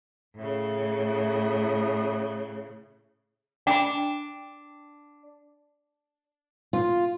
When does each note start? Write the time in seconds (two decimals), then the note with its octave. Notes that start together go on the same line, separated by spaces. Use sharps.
0.36 A2 C#3
3.67 D4 G5 B5
6.73 F4